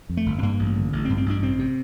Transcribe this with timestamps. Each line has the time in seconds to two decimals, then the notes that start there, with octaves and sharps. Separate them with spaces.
0.09 F2
0.17 A3
0.26 G1
0.38 C4
0.43 G2 A#3
0.59 A1
0.76 D3
0.93 A1
1.05 C4
1.09 G2
1.18 C4
1.26 A1 D4
1.42 C3 C4
1.59 C3